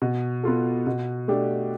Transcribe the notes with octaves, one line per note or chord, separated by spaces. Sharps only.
B2
B3 F4 A4
B2
A3 D4 G4